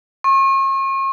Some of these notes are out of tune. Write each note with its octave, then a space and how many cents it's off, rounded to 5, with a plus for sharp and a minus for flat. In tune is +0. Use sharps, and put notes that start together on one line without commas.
C#6 -40